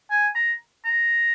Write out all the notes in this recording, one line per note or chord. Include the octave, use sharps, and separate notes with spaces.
G#5
A#5
A#5